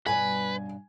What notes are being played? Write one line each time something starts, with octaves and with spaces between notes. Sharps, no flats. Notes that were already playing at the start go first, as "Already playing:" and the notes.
G2 B2 C#4 B4 G#5